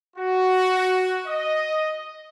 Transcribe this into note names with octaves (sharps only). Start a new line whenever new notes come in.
F#4
D#5